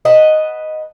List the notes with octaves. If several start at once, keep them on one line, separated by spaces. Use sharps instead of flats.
B4 D#5 F#5 A5